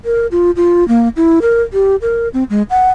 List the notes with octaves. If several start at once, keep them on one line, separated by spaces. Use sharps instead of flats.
A#4
F4
F4
A#3
E4
A#4
G4
A#4
C4
G#3
F#5